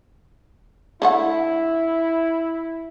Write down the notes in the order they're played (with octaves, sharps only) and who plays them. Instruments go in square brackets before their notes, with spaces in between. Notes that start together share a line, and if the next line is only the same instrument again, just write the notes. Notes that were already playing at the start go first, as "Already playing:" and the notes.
[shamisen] D3 A3 F#5 [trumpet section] E4